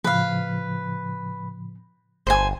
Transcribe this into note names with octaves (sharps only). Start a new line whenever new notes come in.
A2 C#3 F3 B4 F5
G1 C5 G#5